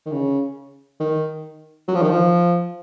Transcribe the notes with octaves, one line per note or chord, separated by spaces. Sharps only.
D#3
C#3
D#3
F#3
F3
D#3
F3